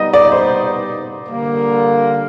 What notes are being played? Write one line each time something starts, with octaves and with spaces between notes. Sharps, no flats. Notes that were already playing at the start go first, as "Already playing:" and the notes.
Already playing: G3 B3 D#4 D#5
D5
C5
D3 G3 A#3